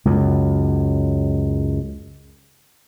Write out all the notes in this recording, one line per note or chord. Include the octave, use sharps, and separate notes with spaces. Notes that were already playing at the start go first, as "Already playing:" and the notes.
C#2 F#2